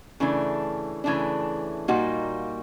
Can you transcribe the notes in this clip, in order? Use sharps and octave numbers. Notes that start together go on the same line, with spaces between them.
C#3 E3 A3 D4
C#3 E3 A3 D4
A#2 G3 A#3 D#4 F#4